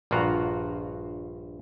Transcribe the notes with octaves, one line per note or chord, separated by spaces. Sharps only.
A#1 G2 F4 F#4 A#5